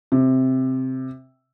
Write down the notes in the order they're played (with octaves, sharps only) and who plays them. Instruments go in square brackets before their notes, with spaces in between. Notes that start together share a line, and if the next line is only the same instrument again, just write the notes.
[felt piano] C3